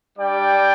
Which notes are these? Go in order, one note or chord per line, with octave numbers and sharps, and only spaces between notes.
G3 D4 G4 D5 G5